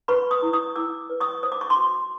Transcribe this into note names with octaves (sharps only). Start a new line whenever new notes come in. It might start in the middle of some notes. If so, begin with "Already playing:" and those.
B4 B5 C#6
C#6 D#6
E4
C#6 D#6
E4 D6 E6
B4
C#6 D#6
C5 D#6
D6
C#6
C6 D6
F#4